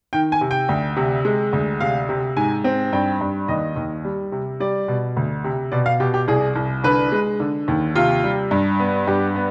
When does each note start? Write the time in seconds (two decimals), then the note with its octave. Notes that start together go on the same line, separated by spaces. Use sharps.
0.13 D#3 G5
0.32 G#5
0.41 C3
0.51 G5
0.69 D2
0.96 C3
1.25 G#3
1.53 D2
1.81 C3 F5
2.09 C3
2.37 G#2 G#5
2.64 C4
2.93 G2 G5
3.21 G2
3.48 D#2 D#5
3.76 D#2
4.04 G3
4.32 C3
4.60 G3 D5
4.88 B2
5.16 D2
5.44 C3
5.72 B2 D5
5.86 F5
6.00 B2 G4
6.14 G4
6.28 C2 G#4
6.56 C2
6.84 D3 B4
7.12 G#3
7.40 D3
7.68 D#2
7.95 C3 F4
8.24 G3
8.51 G2
8.80 B3
9.07 G2 G4
9.35 B3